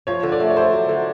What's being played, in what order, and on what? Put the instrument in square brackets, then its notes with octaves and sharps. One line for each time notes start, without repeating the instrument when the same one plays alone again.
[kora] F3 [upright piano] C#5
[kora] D3
[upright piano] D5
[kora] A3
[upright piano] C#5
[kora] A3 [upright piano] C5
[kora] F#3
D3